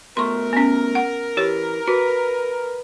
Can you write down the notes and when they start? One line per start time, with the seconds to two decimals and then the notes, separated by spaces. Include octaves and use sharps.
0.17 B2 A3 A#4 C6 C#6
0.53 B3 C#4
0.95 F#5
1.37 E3 G4 C#5
1.88 F#4 B4